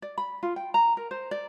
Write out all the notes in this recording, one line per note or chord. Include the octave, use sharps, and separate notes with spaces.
D5
B5
F4
G5
A#5
A#4
C5
D5